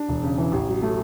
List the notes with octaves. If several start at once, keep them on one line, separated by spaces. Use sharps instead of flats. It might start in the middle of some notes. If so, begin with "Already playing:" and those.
Already playing: D4
E1
C#3
E3
A1
F#3
A3